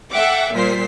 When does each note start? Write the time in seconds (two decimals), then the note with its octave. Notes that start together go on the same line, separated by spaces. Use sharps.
0.12 A4 E5 F#5 G5 D6
0.53 A#2 G3 C5 B6 C7